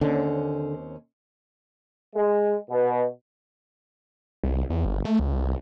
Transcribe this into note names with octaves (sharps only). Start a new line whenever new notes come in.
D#2 D3 C4 C#4
G#3
B2
C2
E2
G1
A3
C#2
C2